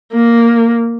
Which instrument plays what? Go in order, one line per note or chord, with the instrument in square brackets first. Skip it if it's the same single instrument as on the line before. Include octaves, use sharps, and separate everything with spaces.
[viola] A#3